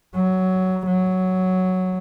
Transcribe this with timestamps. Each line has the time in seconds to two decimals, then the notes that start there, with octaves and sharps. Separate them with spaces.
0.15 F#3
0.86 F#3